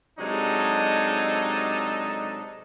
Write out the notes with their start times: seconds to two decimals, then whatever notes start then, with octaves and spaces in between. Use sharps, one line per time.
0.19 C3 F#3 G#3 D4 D#4 A4